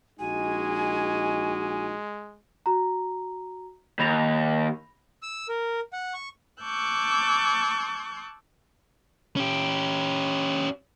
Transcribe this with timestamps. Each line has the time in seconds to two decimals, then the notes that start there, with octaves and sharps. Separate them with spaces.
0.19 A#1 G#3 D#4 F#4 G#5
2.66 F#4 A#5
4.00 D#2 B5 A#6 F7
5.22 E6
5.49 A#4
5.93 F#5
6.14 C#6
6.62 A5 C#6 D6 E6 F#6 G6
9.36 C#4 G4